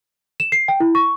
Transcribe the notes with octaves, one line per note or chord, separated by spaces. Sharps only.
E7
C7
G5
E4
C#6